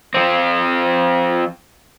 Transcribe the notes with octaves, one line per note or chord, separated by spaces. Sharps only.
F3 C4